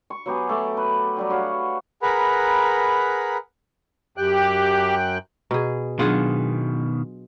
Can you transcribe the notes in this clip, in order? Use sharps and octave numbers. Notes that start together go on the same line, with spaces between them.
C#6
F#3 B3 G4 G#4
A3 D6
B4
F#3 G3 G4
F#4 C#5 F5 F#5
G#4 A#4 B4 F#5 A#5 B5
F#2 G4 G5 F#6
B2 G#4 A#5
B2 D#3 F#3 B3 D4 F4 G#4 F#5